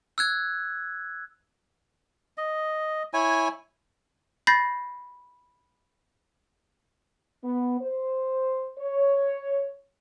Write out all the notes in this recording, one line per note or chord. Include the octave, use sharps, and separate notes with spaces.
E6 F#6 G#6
D#5
E4 C#5 G#5
B5 G6 A6 A#6 C7
B3
C5
C#5